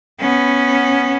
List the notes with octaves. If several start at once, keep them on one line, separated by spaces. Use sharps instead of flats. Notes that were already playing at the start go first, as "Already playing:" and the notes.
B3 C#4